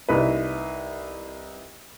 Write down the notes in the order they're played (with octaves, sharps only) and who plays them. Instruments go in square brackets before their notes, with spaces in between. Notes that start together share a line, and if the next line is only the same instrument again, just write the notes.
[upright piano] C2 D#4 E4 B4